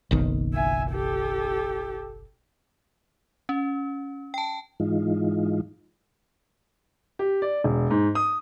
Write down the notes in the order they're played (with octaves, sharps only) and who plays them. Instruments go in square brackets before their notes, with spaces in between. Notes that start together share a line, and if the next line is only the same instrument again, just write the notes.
[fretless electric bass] F#1 B1 D#3
[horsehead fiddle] E5 G#5
G4 A4
[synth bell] C#4
G5 A5
[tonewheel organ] G#2 E3 G#3 D#4 F4
[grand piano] G4
D5
E1
G#2
D#6